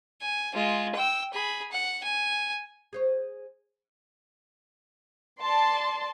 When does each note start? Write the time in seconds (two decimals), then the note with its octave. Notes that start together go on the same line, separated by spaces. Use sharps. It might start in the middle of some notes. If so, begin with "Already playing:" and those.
0.22 G#5
0.55 G#3 F4
0.95 G5 E6
1.33 G#4 B5
1.72 F#5
2.04 G#5
2.93 G#4 C5 C#5
5.41 D5 A5 C6